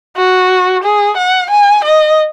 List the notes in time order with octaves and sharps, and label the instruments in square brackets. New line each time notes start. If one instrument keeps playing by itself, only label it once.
[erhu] F#4
G#4
F#5
G#5
D#5